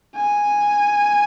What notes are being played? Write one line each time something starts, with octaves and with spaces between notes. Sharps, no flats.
G#5